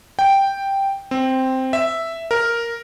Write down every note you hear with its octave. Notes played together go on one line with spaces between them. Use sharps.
G5
C4
E5
A#4